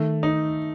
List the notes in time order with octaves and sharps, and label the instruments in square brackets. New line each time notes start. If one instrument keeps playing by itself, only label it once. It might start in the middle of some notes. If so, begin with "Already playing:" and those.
Already playing: [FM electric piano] D#3 [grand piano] A3
[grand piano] D#4